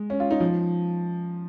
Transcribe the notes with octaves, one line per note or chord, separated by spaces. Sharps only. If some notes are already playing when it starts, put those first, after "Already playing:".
Already playing: G#3
C#4
F4
D#4
F3